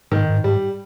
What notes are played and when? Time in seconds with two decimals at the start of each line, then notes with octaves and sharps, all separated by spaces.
0.11 G#2 D#3
0.29 G#2
0.44 G#2 G3